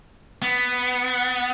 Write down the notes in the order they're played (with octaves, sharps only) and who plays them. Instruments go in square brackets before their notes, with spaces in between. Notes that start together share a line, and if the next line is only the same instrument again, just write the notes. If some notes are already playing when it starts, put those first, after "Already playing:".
[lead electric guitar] B3